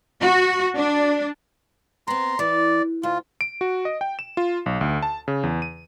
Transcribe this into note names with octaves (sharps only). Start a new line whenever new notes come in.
F#4
D4
B3 C4 A#5 C6
E3 D5
D2 F4
D7
F#4
D#5
G5
E7
F4
B1
D2
A5
C#3
E2
D#7